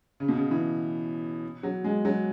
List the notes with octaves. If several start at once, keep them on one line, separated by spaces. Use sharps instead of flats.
C#3
B2
C#3
E3
F#3
G#3
F#3